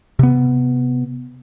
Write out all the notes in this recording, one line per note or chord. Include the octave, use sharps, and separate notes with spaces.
C3 B3